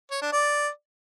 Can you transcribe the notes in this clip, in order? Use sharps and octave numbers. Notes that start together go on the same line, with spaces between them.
C#5
D4
D5